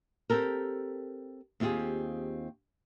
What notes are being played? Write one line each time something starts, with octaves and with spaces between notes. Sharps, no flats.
C4 G4 A4 A#4
D#2 C4 F4 G4 G#4